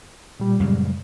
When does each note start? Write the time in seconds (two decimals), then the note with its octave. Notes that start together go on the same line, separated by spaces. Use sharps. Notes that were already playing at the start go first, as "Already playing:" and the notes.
0.40 A#2 G3
0.60 F#2 C#3 G#3